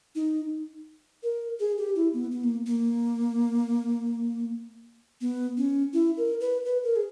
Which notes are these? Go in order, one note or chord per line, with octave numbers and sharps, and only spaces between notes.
D#4
A#4
G#4
G4
E4
B3
B3
A#3
A#3
B3
C#4
E4
A#4
B4
B4
A#4
G#4